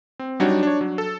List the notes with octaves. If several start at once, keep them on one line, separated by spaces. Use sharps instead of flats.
C4
F#3 G3 D4 D#4 F#4 C#5
D4 C#5
F#3
A4